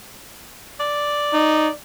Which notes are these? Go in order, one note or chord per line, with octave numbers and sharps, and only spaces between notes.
D5
D#4